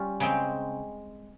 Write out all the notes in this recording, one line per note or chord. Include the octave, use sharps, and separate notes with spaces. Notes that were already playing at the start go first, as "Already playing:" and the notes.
Already playing: G3 C#4 F4
C#3 G#3 C4